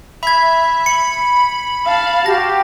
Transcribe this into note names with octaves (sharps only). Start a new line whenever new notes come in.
E5 B5 G#6
B5 C#7
F5 A5
F#4 G4 A#6